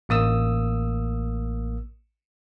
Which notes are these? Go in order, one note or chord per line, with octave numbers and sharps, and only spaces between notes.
A1 A#3 D#6 E6